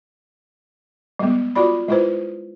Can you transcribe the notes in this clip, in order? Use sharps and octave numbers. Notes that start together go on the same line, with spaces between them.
G3 G#3 B3
F4 F#4 D5 B5
G#3 E4 F4 B4 C5